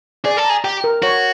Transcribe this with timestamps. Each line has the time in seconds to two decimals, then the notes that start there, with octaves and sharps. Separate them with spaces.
0.25 G#4 D5
0.37 A4
0.45 G#4 A#5
0.64 G4 G5
0.84 A#4
1.03 F#4 C#5